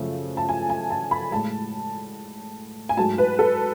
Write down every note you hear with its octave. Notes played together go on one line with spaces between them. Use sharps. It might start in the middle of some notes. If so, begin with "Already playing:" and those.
Already playing: F#2 C#3 F3 A3
A5
G#5
G#5
A5
B5
A2 G#3 A5
G#5
G#2 F#3 A3 A5
B4
A4